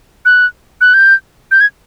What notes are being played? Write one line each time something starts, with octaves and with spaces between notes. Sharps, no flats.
F#6
F#6
G6
G6
G#6